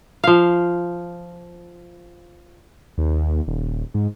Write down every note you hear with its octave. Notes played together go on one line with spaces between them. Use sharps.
F3 F5
D#2
D#1
G#2